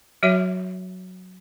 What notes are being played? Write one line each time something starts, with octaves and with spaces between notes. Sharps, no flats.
F#3 F#4 C#5 E5